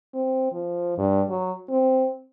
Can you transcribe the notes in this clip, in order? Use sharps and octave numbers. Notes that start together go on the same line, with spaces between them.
C4
F3
G2
F#3
C4